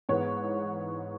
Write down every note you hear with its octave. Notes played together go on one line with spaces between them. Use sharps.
G#2 E3 G#3 B3 C#5